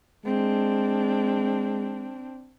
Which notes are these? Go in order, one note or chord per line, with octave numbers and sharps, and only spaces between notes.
G#3 C4 D4